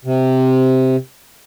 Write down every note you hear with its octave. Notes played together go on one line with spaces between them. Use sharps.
C3